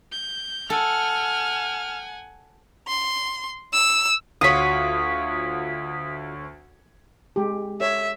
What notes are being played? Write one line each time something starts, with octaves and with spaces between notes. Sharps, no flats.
G6
A4 F#5 G#5 F6
C6
E6
D2 F4 F#4 C#5 D#6 B6
G#3 G4
A4 C#5 E5